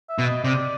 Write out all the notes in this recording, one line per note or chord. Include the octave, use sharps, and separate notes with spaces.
E5
B2
D#5
C3 D5